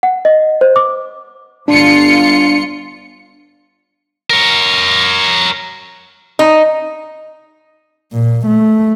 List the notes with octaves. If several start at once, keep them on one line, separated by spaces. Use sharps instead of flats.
F#5
D#5
C5
D6
G1 D4 F4 C#7
A#4 C#5
D#4
A#2
A3